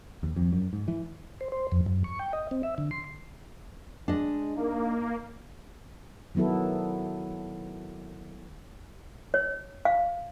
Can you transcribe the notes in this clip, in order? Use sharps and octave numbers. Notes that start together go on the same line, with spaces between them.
D#2
F2
F#2
G#2
E3
C5
C5
F2
F#2
C#6
G5
D#5
C4
E5
D3
C6
G#3 D4 D#5
A#3 D#4
D#3 F#3 B3 E4 A4
C#5
F5